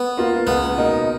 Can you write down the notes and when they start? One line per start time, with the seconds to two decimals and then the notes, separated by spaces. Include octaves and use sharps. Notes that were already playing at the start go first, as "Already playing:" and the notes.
Already playing: B3
0.18 A#3 F4
0.47 C#2 B3
0.77 B2 A#3 D#4 A#4